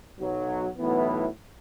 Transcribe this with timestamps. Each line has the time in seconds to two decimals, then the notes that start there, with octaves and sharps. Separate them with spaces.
0.19 B1 B2 F#3
0.78 B1 A2 E3 B3